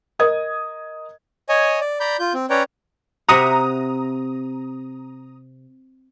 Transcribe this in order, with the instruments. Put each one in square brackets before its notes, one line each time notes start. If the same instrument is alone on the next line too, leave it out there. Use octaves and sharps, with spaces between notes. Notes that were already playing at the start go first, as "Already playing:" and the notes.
[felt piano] A#4 D#5 D#6 G#6
[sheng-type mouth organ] C#5 D#5 G#5
D5
D5 A#5 B5 G6
F4 G6
C4
C#4 B4 C#5 D5 G5 A#5
[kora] C3 E5 F#5 [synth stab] A#5 D#6